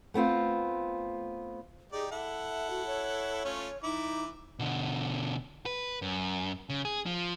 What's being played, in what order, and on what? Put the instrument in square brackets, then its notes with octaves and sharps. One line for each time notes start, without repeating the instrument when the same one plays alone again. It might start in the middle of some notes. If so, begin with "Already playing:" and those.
[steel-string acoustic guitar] A3 B3 C4 F4
[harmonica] D#4 G4 D5 [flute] G#4
[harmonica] E4 A4 F#5 [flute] E5
[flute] F#4
C#5
[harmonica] A3 C#4 F4
[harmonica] E3 E4 D6 [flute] D#4
[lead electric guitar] B2 D3
B4
F#2
C#3
G#4
F3